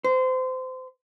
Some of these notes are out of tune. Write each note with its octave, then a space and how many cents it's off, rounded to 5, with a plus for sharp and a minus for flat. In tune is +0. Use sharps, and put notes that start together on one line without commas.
C5 -25